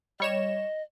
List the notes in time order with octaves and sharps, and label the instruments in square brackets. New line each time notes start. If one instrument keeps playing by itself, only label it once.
[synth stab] G3 C#5 E7 [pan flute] D#5